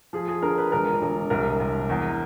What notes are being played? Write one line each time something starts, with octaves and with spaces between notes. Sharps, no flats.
F3 G#4
G#4
D3 A#4
B4
E1 A#4
E1
C2 A#4
C2
E2